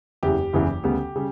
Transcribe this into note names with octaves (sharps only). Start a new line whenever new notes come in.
F#1 E2 C#3 E3 G4
F#1 E2 C#3 E3
D2 C#3 G3 B3
C#3 G3